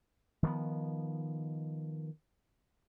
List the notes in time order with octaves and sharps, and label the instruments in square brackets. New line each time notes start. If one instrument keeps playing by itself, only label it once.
[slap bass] D#3 F3 B3